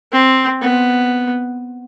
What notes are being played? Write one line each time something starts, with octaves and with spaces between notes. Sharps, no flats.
C4
B3